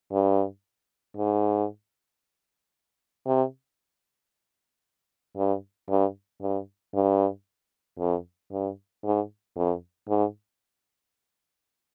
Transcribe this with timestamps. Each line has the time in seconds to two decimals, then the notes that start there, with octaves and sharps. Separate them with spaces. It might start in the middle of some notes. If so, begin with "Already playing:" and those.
0.12 G2
1.17 G#2
3.26 C3
5.37 G2
5.89 G2
6.41 G2
6.95 G2
7.99 F2
8.52 G2
9.04 G#2
9.56 F2
10.09 G#2